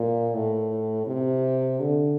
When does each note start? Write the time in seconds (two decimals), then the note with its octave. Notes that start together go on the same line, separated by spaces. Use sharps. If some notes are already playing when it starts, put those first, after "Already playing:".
Already playing: A#2
0.34 A2
1.07 C3
1.80 D3